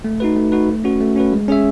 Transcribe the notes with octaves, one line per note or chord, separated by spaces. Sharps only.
A3
D#4 F#4 B4
A3
D#4 F#4 B4
A3
C#4 F#4 B4
A3
C#4 F#4 B4
G#3
C#4 G#4 C#5 E5